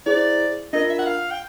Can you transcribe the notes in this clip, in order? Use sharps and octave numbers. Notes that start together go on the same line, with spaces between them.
E4 G#4 C5 D5
D4 F4 A#4 D#5
E5
F#5
F5
G5